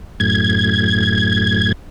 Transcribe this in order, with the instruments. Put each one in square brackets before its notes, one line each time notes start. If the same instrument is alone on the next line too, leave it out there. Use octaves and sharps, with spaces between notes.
[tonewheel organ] F#2 A2 G#6